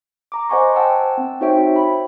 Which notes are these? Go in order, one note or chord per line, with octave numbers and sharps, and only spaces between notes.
A#5 D6
C5 D#5 F#5 G#5 C6 C#6
F#5 G5 A5 E6
C4
D#4 F#4 C5 C#5 E5 G5
B5